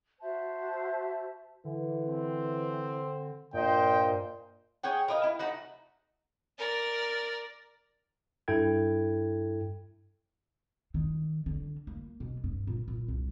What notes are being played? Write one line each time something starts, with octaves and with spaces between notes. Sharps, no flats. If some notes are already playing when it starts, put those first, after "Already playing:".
F#4 C5 E5 A5
D3 E3
C4
G2 A#2 C5 D#5 G5
G#4 C#5 F#5 G5
A#4 B4 D#5 F5
E4
A3 D#4 F#4 F#5
A#4 D5
G2 E4 A4 G5 G#6
D#3
D3
A#3
B2
G2
A#2
A#2
C2